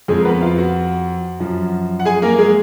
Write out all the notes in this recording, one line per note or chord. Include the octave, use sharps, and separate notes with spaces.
F2 F3 G#3 G#4
A#4
B3 B4
F4 F5
F#4 F#5
F#2 F3
F#5
G#4 G#5
A#3 A#4
G#3 G#4